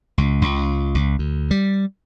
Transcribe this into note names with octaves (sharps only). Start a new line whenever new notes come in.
C#2
C#2
C#2
D2
G3